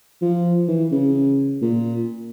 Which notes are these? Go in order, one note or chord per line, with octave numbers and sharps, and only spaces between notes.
F3
E3
C#3
A#2